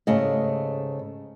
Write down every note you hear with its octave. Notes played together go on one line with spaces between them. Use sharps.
G#2 C#3 A3 G4 D#5